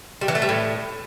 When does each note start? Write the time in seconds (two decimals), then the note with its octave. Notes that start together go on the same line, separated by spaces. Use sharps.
0.21 G3
0.28 E3
0.35 A3
0.42 G3
0.49 A2